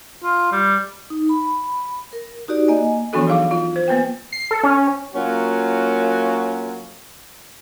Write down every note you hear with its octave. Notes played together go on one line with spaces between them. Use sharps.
F4
G3
D#4
B5
A#4
D#4 F#4 G4 D5
A#3 D#5 G#5
E3 F3 B3 D4 F#4 A4
F#3 D#4 G#4 F5 D6
F4
C5
A#3 B3 B4 G5
C7
A4
C#4
F#3 A#3 C#4 F4 F#4